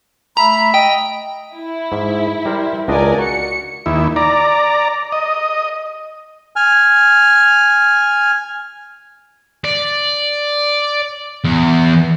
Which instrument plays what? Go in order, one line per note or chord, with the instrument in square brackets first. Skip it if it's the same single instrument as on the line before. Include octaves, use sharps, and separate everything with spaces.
[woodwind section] A3 E5 B5 [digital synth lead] A#5
[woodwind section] D#5 [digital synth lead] G5
[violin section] E4
[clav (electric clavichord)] G#2
G3 A#4 C5
[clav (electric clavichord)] C#2 D4 D#5 [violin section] A#4 D5 G#5
[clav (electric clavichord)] F#4 [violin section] C#7
[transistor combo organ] D#2 E4
D5 A#5
D#5
[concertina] G#5 F6
[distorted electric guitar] D5
E2